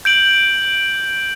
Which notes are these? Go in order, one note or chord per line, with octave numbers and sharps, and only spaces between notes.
G6 D7 F#7